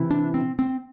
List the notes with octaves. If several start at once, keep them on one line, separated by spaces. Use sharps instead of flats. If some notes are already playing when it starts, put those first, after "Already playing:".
Already playing: C3 E3 E4
D4
C4
C4